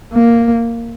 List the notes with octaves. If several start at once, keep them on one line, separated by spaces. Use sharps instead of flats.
A#3